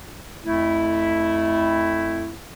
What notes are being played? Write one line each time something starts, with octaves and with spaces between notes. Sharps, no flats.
F2 A3 E4